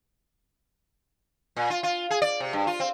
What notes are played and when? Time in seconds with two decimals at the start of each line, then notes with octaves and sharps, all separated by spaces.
1.56 A#2
1.70 F4
1.83 F4
2.11 G#4
2.22 D5
2.40 C3
2.53 G2
2.67 F4
2.80 C4